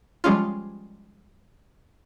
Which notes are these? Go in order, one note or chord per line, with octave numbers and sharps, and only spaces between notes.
F3 G3 G#3 C#4 F4